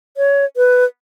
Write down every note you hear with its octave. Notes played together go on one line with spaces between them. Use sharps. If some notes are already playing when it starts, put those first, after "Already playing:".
C#5
B4